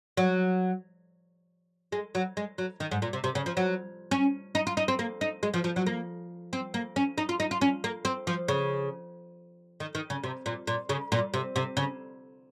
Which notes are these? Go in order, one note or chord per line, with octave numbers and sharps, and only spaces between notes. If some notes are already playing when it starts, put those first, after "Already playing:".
F#3
G#3
F#3
G#3
F#3
D#3
G#2
A#2
C3
C3
C#3
F3
F#3
C#4
D#4
F4
D#4
C4
A#3
D#4
G#3
F3
F3
F#3
A#3
C4
A#3
C#4
D#4
F4
D#4
F4
C#4
A#3
C4
F3
C#3
D#3
D#3
C#3
C3
A#2
A#2
C#3
A#2
C3
C3
C#3